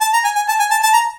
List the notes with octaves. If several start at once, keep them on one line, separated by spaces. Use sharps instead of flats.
A5
A#5
G#5
G#5
A5
G#5
A5
A5
A#5